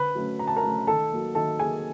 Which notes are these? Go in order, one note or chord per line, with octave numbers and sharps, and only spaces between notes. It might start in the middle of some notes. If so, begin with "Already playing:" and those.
Already playing: D3 B4 B5
F#3 A3 C#4
D3 A#5
A5
A#4 A#5
F#3 A3 C#4
D#3 A4 A5
F#3 A#3
D#3 A4 A5
F#3 A#3 G#4 G#5